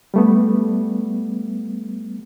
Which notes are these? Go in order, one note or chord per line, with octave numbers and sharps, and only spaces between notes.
G3 A3 B3